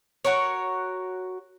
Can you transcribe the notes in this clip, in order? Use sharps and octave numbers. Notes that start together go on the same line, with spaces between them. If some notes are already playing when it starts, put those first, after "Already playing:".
F#4 A#4 C#5